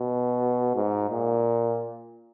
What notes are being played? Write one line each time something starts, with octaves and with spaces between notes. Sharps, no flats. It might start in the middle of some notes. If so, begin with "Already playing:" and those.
Already playing: B2
G#2
A#2